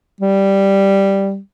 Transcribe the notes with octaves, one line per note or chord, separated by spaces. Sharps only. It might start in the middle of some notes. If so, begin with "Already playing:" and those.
G3